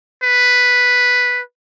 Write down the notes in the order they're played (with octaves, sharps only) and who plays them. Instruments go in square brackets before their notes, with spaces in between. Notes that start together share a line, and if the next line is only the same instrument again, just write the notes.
[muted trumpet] B4